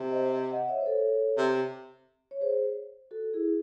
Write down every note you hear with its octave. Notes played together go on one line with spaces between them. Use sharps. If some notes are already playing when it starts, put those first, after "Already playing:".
Already playing: C3
C5 D#5
D#5 F#5
C#5 E5
C5
A4 C#5
C3
C#5
G#4 C5
F#4 A4
E4 G#4